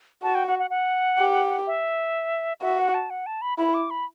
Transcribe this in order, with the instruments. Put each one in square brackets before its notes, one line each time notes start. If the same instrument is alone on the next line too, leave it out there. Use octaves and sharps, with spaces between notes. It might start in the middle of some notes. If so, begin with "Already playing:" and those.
[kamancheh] F#4 [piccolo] A5
[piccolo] G5
F#5
F#5
F#5
[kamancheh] G4
[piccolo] E5
[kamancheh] F#4 [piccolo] E5
[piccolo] F#5
A5
F#5
A5
B5
[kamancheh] E4 [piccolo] B5
[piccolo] D6
B5